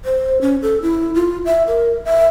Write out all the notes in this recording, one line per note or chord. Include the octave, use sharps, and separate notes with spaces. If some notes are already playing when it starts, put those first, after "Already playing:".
C5
C#4
A4
E4
F4
E5
A#4
E5